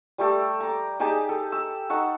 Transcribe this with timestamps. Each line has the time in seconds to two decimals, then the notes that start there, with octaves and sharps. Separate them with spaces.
0.18 G3 A3 G4 A4
0.60 A#5 D6
1.00 D#4 G4 G#4 A5
1.29 A4
1.52 E6
1.90 D#4 A4 F#5 C#6